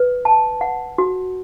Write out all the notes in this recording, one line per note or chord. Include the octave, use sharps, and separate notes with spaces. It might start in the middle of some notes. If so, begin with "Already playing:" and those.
Already playing: B4
A5
F#5
F#4